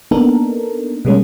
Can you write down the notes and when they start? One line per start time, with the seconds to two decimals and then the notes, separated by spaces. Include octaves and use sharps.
0.11 A#3 B3 D4 D#4 A4 A#4
1.05 B2 G3 G#3 A#3 C#4